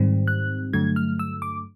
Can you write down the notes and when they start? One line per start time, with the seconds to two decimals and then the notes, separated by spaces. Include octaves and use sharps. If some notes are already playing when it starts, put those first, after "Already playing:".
Already playing: G#2 D#3 G3 C4
0.28 F#6
0.73 G2 D3 F#3 A3 G#6
0.96 F6
1.19 E6
1.42 D6